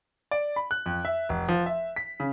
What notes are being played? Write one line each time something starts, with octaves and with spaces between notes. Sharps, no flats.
D5
B5
F#6
F2
E5
F1
F3
E5
B6
C#3